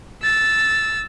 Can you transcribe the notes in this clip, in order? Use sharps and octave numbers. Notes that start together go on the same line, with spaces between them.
E6 A6